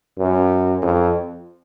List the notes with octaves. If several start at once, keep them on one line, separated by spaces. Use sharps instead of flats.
F#2
F2